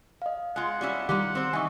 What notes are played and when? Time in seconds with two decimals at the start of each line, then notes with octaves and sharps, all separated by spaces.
0.22 D#5 F5
0.56 G#3 F4 F#5
0.81 G3 C#4 E4
1.09 D#3 G3 D#4 F4 G4 F#5
1.35 C4 C5
1.53 E3 D#4 G#5 C#6